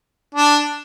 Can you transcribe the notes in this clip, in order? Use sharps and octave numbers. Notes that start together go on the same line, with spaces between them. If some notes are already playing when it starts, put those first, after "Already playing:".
D4